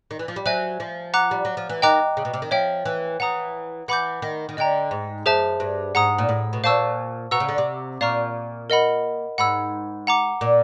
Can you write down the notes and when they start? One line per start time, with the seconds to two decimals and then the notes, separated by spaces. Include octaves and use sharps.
0.11 D#3
0.19 E3
0.28 F3
0.36 G3
0.46 F#3 C5 E5 G#5
0.80 F3
1.14 F#5 A#5 D6 F#6
1.31 G3
1.45 F#3
1.57 F3
1.69 E3
1.82 D#3 D#5 G5 A#5 D6 F#6
2.17 C#3
2.25 B2
2.34 C3
2.42 D#3
2.51 F3 C#5 E5 G5
2.85 E3
3.20 E3 F#5 A#5 D#6
3.88 E3 F#5 B5 D6 G6
4.22 D#3
4.49 D#3
4.57 D3 D#5 G5 A#5
4.91 G#2
5.26 F#2 G#4 C5 E5 A5
5.60 G2
5.95 G#2 F#5 A#5 D#6
6.18 A#2
6.29 A2
6.53 B2
6.64 A#2 C5 F5 A5 C#6 E6
7.31 B2 F#5 A#5 C#6 E6
7.40 C#3
7.49 D3
7.58 C3
8.01 A#2 D5 F5 A#5 C#6 F6
8.70 A#4 D#5 F#5 B5
9.38 G#2 F#5 B5 E6
10.07 F#5 A#5 D6
10.41 A#2